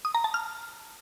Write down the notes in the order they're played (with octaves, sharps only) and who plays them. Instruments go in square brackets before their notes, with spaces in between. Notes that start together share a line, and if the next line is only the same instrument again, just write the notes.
[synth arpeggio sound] D#6
A#5
A5
F6